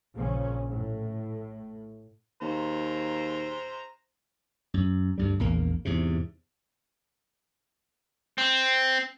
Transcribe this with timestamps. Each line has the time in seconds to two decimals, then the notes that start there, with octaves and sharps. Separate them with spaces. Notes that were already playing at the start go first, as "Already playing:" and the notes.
0.13 A#1 A#2 C#3 F3 C#4
0.68 A2
2.41 D#2 C5 A#5
4.74 F#2
5.18 D2 G2 G3
5.39 A#1 E2 A#3
5.85 E2 G#2 C3
8.38 C4